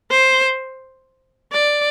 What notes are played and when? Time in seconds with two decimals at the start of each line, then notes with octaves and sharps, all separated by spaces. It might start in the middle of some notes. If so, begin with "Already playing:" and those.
0.10 C5
1.52 D5